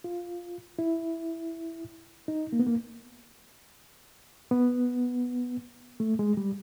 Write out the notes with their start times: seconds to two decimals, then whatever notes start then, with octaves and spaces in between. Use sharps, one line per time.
0.04 F4
0.79 E4
2.28 D#4
2.53 A#3
2.59 B3
2.67 A#3
4.51 B3
6.00 A3
6.19 G#3
6.37 G3